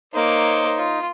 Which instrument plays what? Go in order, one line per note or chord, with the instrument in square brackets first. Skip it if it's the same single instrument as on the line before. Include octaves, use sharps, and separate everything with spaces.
[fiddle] A#3 D6 [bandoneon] D#4 [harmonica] C5 C#5 D#5
[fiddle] F4